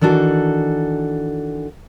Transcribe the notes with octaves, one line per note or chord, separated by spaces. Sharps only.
D#3 E3 D4 F#4 A4